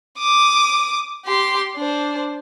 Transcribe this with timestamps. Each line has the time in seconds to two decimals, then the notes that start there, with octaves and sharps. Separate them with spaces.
0.19 D6 D#6
1.25 G4 C6
1.77 D4 C5